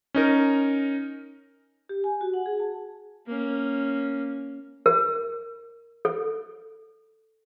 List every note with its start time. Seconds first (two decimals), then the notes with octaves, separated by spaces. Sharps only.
0.14 C#4 D#4 A#4
1.89 G4
2.04 G#5
2.21 F#4
2.34 F#5
2.46 G#4
2.60 A5
3.27 A#3 C#4
4.86 A#4
6.05 A4